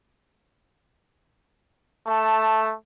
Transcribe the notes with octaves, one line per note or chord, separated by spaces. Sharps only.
A3 A5